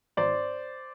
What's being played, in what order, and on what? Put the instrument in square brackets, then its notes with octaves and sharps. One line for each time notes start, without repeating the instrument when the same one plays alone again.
[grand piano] G#1 C5 D5